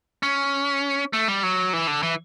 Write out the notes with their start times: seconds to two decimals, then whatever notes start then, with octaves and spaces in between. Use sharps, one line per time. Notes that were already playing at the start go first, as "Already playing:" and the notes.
0.23 C#4
1.13 A3
1.28 G3
1.43 F#3
1.73 E3
1.87 D3
2.03 E3